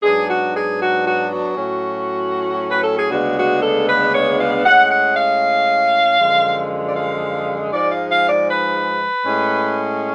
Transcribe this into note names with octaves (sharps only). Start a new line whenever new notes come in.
G#2 F#3 B3 D4 G#4
F#4
G#4
F#4
F#4
F#4
A2 F#3 C#4
B4
A4
G#4
D2 C#3 G#3 B3 D4 F#4
F#4
A4
B4
C#5
F5
A2 G#3 C#4 F#5
F#5
F5
F#2 D3 F3 G#3
D5
F5
G#2 F3 G#3 D5
F5
F5
D5
B4
A2 G#3 C#4